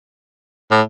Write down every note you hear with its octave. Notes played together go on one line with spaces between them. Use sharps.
A2